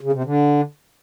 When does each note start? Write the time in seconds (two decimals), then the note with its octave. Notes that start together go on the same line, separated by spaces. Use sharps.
0.01 C#3
0.13 C3
0.24 D3